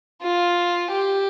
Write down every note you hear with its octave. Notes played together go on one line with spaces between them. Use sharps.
F4
G4